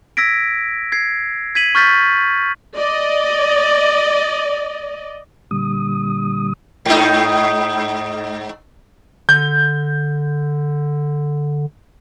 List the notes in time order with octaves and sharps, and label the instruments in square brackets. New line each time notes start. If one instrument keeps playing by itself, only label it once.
[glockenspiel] E6 G#6 A#6 B6 D7
G#6 C7
G#6 B6 D#7 F#7
C#6 F6 G6 A6 B6
[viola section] D5 D#5
[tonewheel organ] A#2 D3 G3 D#6
[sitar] G#2 D#4
[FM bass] D3 [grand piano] G6